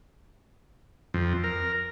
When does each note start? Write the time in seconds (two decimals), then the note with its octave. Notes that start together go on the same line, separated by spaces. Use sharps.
1.14 F2
1.44 A#4